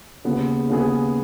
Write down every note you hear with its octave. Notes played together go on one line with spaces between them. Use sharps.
D#2 C#3 B3 G#4
D#2 C#3 B3 G#4